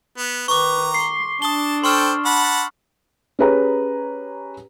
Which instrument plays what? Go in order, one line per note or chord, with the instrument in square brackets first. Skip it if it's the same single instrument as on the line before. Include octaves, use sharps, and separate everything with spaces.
[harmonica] B3
[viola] D#3 B4 [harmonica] A#5 [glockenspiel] C#6 D6
[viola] C6 [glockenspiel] C7
[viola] D4 [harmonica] A5 [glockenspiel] D#6 G7
[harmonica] A4 C5 G5 [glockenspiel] C6 C#6 F6
[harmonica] F#5 A5 B5
[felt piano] C#4 G4 G#4 B4 C#5 A#5